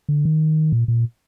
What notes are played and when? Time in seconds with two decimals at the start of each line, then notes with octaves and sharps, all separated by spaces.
0.09 D3
0.25 D#3
0.72 A#2
0.88 A#2